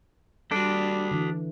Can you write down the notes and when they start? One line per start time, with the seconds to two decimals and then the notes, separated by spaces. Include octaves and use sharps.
0.51 G3 D4 F#4 A4
1.11 D3 E3